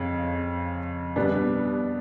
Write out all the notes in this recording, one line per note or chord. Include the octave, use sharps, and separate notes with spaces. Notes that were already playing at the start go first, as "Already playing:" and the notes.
Already playing: F2 C#3
B2 G3 B3 D4